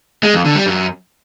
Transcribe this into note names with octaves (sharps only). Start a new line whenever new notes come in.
G#3
F2
D3
G3
F#2